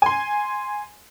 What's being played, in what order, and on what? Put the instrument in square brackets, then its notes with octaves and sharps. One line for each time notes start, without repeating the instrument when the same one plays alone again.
[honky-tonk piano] G#5 C6